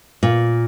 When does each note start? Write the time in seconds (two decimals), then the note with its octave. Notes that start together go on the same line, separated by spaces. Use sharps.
0.23 A#2